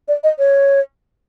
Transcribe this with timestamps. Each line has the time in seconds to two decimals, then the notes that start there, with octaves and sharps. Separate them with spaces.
0.08 D5
0.24 D#5
0.39 C#5